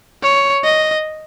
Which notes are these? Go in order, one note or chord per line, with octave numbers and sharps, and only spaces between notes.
C#5
D#5